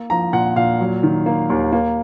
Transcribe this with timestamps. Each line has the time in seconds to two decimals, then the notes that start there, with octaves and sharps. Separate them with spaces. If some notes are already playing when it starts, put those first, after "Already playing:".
Already playing: A#3
0.10 F3 A#5
0.33 A#2 F#5
0.56 A#2 F5
0.80 F#3
1.03 D#3
1.26 A#3
1.50 D#2
1.72 A#3